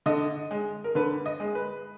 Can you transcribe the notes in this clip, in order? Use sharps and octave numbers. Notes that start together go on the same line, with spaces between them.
D3 D#5
G#3
A#4
D3 B4
D#5
G#3
B4